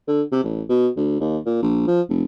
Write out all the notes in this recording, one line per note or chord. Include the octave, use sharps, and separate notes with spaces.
D3
C3
A1
B2
D2
D#2
A#2
A#1
F3
F1